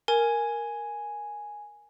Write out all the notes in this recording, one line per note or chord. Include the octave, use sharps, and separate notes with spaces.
A#4 G#5